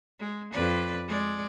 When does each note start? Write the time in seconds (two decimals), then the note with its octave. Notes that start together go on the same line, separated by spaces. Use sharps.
0.20 G#3
0.52 F2 B4 D5
1.08 G#3 D5